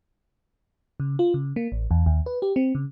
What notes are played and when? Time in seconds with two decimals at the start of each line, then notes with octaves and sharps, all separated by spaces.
1.00 C#3
1.19 F4
1.34 C#3
1.56 A#3
1.72 A1
1.91 E2
2.06 D#2
2.26 B4
2.42 G4
2.56 C4
2.75 C#3